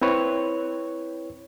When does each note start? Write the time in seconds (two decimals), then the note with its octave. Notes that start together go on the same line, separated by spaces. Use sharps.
0.02 C4 E4 B4 C#5